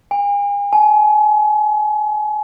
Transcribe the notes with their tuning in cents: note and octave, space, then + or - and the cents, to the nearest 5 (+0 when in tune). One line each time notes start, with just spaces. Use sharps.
G#5 -40
G#5 +35